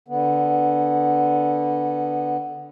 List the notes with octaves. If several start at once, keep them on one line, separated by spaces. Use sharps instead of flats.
D3 B3